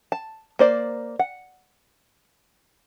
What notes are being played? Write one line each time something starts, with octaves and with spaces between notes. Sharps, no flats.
A5
A#3 C5 D5
F#5